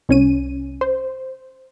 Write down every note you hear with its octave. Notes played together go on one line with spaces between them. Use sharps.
C2 C#4 D#7
C5